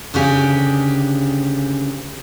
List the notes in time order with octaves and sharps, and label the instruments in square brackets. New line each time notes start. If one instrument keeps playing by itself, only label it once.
[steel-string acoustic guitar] D2 C#3 D4 G4 G#5